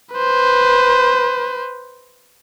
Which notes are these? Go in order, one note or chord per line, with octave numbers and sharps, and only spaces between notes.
B4 C5